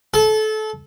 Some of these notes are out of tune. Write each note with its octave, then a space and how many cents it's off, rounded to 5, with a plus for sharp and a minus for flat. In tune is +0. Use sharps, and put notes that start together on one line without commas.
A4 -25